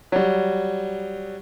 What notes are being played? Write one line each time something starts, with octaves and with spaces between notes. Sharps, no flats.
F#3 G3